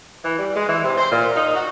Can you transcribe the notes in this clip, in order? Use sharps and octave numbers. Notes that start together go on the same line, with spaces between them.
E3
G3
G#3
E3
C3
C5
A#2
D#4
F#4